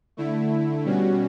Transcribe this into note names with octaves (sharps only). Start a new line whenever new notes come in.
D3 A3 E4
B2 G3 C#4 F#4